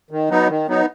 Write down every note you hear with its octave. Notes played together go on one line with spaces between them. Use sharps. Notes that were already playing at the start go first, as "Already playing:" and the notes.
D#3
F#3 B3 D#4
D#3
F#3 B3 D#4